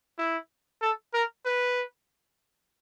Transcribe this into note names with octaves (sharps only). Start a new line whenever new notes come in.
E4
A4
A#4
B4